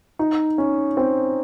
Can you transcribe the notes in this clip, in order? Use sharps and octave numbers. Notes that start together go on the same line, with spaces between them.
D#4
C#4
C4